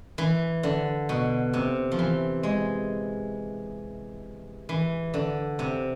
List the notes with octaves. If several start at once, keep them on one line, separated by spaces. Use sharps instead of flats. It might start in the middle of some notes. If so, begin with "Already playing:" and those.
E3
D3
B2
C3
F3
E3
G#3
E3
D3
C3